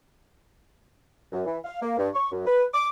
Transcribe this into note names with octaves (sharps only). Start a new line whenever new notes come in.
F#2
E3
F5
A#3
G2
C#6
F#2
B4
D6